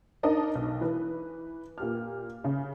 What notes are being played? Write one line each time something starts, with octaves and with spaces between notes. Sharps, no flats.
D4 D#4 A#4 D#5 A5
B1
E3 B4
A#2 G4 F6
C#3